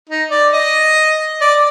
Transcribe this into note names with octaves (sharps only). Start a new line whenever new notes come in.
D#4
D5
D#5
D5